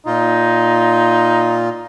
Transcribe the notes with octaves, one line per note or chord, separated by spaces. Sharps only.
A#2 D#4 F4